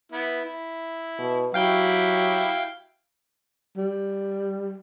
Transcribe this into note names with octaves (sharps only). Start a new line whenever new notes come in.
B3 E4
E4
B2
F#3 E4 F#4 G4 F5 G5 G6
G3